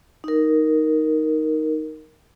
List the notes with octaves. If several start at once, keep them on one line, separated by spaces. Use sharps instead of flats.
D#4 A#4